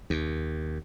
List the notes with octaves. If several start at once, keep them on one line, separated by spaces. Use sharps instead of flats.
D#2